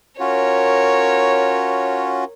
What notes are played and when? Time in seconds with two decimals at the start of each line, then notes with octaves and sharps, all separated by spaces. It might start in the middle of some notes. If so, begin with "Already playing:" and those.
0.20 C#4 F4 F#4 A#4 C#5